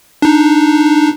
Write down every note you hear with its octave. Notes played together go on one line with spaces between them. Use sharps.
D4 D#4